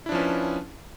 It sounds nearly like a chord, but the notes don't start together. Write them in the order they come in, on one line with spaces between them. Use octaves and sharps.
E4 D4 F3 C#4 B4